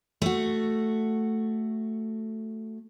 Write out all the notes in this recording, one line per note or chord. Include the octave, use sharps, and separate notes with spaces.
A3 F#4